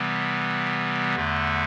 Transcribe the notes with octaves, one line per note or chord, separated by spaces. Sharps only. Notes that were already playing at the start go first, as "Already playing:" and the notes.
Already playing: C3 E3 G3 B3
E2 D3 A3